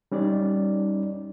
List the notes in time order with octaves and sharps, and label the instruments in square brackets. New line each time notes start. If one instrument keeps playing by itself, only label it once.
[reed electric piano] G3 C#4 D#4 D5